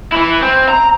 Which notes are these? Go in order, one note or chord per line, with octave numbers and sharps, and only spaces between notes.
E3 E4
C4
A#5